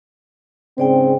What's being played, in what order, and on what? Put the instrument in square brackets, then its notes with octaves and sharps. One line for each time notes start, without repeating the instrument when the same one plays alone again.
[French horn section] G#2 C#3 C4 [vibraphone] C5 D5 G5